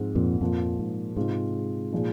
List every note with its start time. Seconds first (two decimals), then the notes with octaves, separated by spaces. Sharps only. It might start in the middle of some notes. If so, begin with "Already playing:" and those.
Already playing: G#2 F3 C4
0.15 F2 A#2
0.41 F2 A#2 F3 A#3
0.79 G#2
1.17 G#2 C3 G#3 F4
1.92 A#2 F3 G#3 D#4